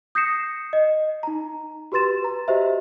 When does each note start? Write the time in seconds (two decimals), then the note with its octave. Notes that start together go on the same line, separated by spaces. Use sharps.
0.15 D#6 G6 A#6 C7 C#7 E7
0.73 D#5
1.23 D#4 A#5
1.92 F#4 G4 B4 C6 A6 E7
2.23 B4 A#5
2.48 F#4 G4 C5 D#5 E5